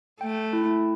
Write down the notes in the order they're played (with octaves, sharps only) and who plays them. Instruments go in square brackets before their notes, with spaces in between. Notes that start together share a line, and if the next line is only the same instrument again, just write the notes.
[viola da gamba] A3 [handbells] G5
[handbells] E4